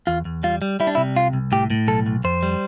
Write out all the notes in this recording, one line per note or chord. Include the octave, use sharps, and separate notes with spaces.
E2 F4
E2
G3 F4
G3
G3 E4
D4
C3 E4
C2 F4
C2
A2 G4
A2
B1 A4
B1
F2 C5
G3